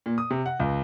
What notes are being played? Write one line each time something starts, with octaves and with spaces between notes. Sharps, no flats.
A#2
D#6
C3
F#5
C#2